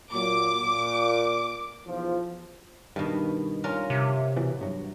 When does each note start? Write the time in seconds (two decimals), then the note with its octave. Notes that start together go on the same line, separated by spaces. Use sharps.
0.12 A#2 F#3 D6
0.62 A#2
1.86 B1 E2 F3
2.96 G2 B2 D#3
3.64 C#4 F4 A#4
3.90 C3
4.36 B2 E3
4.61 G2 F#3